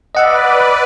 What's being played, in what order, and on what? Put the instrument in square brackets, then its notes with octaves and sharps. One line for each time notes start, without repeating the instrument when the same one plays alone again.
[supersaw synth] B4 D5 [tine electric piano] D#5 F#5 E6